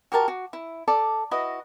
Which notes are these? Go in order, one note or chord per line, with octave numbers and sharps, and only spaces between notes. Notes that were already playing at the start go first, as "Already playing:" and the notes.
F#4 G4 A#4 A5
F#4
E4
A4 D5 A5
E4 F#4 B4 D#5